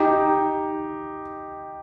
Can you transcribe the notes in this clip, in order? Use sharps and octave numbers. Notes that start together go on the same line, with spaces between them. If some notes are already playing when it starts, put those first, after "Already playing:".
Already playing: D#4 G4